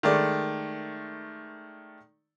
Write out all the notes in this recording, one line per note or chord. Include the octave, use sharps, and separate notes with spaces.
D#3 G#3 A3 D5